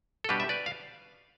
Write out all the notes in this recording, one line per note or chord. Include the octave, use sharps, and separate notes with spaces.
A4
B2 G3 D4 G4 B4
E5
B4 D5
F5